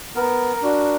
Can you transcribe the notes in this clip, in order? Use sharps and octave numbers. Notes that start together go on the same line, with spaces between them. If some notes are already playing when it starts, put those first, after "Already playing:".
B3 A#4
D4 F#4